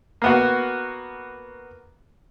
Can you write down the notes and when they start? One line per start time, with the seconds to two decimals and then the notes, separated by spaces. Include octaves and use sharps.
0.22 A#3 B3 F#4